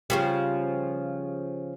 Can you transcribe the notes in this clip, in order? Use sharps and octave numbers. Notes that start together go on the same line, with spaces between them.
C#3 F3 G3